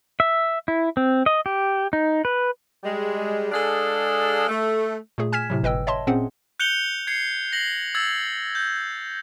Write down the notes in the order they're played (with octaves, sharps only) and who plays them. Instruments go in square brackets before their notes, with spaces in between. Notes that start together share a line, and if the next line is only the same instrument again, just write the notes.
[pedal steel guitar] E5
E4
C4
D#5
G4
D#4
B4
[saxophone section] G3 G#3
G#3 D4 G#4 A4 F5
A3
[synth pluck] A#2 A3 G#4
G#5 F6 G#6 B6 E7
A2 C3 F#3
G1 B4 D#5 G5 E6
C#5 D#5 E5 A5 C6
A#2 C4 C#4 G#4 C5 F#5
[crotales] F#6 G6 C#7 F7 G7
G#6 C7 C#7
A#6 C7 F#7
E6 G#6 A6 F#7
G6